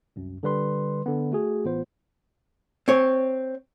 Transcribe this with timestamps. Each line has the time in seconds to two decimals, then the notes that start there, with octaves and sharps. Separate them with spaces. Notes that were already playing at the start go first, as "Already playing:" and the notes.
0.16 C2 F#2
0.43 D3 G3 B4 C6
1.06 D3 B3
1.32 A3 F#4 G#4
1.65 A1 B3 F4 C5
2.88 C4 C#5